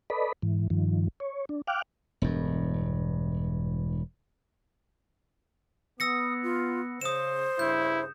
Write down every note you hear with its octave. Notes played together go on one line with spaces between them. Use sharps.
A4 B4 D5 D#5 B5
G#2 E3
G2 D#3 F3
C#5
D4
F5 G5 D6 F6 F#6
E1 G2
B3 D#6 E6 A#6 C#7
F4
C#3 C5 D#6 E7
G2 C#3 E4 G6